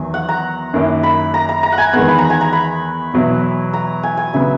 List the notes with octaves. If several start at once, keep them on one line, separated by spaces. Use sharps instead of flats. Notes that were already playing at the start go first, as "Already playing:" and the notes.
Already playing: E2 D#3 F#3 G#5
F#5
A#5
F#2 D#3 A#3 E4
B5
A#5
A#5
A#5
F#5
G#5
E2 D#3 G#3 B3 F#5
B5
A#5
G#5
A#5
B5
E2 B2 F#3 B3 E4
A#5
G#5
G#5
C#3 F#3 B3 E5